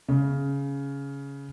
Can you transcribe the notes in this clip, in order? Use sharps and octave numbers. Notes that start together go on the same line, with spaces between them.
C#3